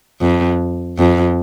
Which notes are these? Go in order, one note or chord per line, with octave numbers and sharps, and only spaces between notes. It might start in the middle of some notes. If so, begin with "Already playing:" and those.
F2
F2